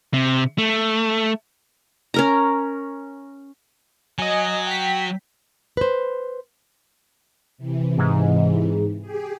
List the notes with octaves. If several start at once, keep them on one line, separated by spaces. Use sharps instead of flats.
C3
A3
C#4 A#4 A#5
F#3 D#5 G#5
G5 B6
B4 C5
C3 E3
G#2
G4 G#4